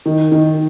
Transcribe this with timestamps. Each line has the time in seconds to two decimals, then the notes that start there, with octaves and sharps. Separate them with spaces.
0.06 D#3
0.32 D#3